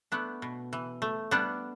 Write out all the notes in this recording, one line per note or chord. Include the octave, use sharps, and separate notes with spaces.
A3 B3 D4
B2
E3
A3
G3 B3 D4